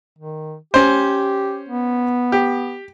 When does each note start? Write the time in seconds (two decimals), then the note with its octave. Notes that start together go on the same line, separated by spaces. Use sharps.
0.19 D#3
0.74 C#4 G4 C5
1.69 B3
2.32 G4